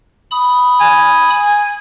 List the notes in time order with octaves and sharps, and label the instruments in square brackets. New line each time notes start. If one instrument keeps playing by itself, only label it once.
[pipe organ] B5 D#6
[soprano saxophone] G#5